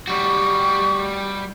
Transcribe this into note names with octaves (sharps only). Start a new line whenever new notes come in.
G3 F#4 C#6